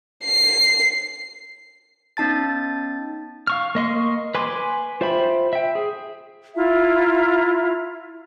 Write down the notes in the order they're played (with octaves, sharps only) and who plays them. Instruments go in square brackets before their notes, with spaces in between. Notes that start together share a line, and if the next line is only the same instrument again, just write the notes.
[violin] C7
[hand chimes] B3 C#4 D#4 A5 A6
[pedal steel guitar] F5 C#6 F6
A#3 D#5 C6 C#6
B4 G#5 C6 D6
F4 C5 E5 G5 B5
E5 G5
G#4
[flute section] E4 F4 E5 A#5